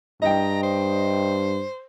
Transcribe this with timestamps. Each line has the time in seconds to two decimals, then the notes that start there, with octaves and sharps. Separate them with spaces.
0.22 G2 D#5 G5 A#5
0.63 C5